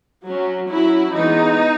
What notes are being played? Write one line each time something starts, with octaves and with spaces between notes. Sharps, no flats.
F#3 C#4
F#3 C#4 E4
E3 G#3 B3 D#4